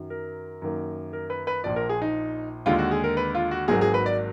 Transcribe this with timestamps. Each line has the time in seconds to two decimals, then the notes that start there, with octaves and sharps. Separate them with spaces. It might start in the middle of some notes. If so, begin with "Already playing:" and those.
Already playing: F#2 D#3 F#3
0.10 A#4
0.62 F#2 D#3 A#3
1.13 A#4
1.30 B4
1.47 B4
1.64 A#1 A#2 F3 D5
1.76 A#4
1.89 G#4
2.02 D#4
2.66 D#2 D3 G#3 F4
2.79 F#4
2.91 G#4
3.04 A#4
3.17 B4
3.35 F4
3.51 F#4
3.68 G#1 G#2 F#3 A#3 G#4
3.81 G#4
3.94 B4
4.06 D5